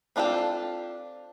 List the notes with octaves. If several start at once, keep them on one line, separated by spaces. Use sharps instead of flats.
C4 D4 F4 G4 A4